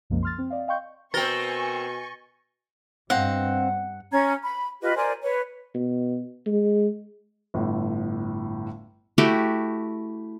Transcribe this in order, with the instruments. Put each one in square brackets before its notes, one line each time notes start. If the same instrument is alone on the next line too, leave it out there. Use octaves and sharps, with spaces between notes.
[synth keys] C2 F#2 C#3 F3 G#3 A#3
C6 F6 A6
C4
D5 D#5 F5
D#5 F5 G5 C6 C#6 G6
[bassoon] B2 [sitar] C4 A#4 [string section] G#5 C#6 [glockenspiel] A6 A#6 G7
[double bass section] G2 [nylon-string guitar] C4 D#5 F5 [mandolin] F#5
[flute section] C#4 A#5 G#6
B5
F4 G4 B4 D#5
A#4 C5 D5 G#5
B4 C#5
[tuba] B2
G#3
[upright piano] G1 A2
[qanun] A3 E4 F#4 G4